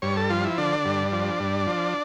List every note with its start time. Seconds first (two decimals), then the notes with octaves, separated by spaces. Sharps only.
0.02 G2 C#5
0.17 A4
0.30 F3 F4
0.44 E4
0.58 D3 D4
0.85 G2
1.12 F3
1.40 G2
1.67 F3